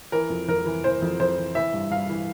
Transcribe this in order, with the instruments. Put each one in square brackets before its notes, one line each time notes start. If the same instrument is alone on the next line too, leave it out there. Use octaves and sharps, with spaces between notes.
[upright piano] E3 A#4
F2
F2 A#4
E3
E3 C5
F2
F2 C5
E3
E3 E5
G2
G2 F5
E3